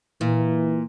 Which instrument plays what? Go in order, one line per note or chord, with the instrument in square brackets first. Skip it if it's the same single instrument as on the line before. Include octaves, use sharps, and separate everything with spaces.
[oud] A#2 [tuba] E3